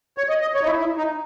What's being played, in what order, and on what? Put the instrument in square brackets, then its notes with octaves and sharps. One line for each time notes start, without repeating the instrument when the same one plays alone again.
[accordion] C#5
D#5
D#5
C#5
D#4
E4
E4
D#4